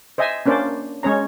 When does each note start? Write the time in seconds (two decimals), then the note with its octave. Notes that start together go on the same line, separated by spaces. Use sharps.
0.18 C5 D#5 E5 G#5
0.46 A#3 C#4 D4 C5 D5
1.03 G#3 C#4 C#5 A#5